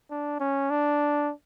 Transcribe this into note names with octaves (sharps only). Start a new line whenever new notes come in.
D4
C#4
D4